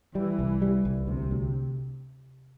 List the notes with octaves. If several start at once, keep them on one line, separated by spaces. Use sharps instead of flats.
E3 G3
C2
G3
C2
D2 C3
D2